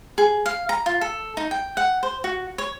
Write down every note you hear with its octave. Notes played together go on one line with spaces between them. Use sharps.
G#4
F5
A#5
F4
A4
D#4
G5
F#5
C5
F#4
C#5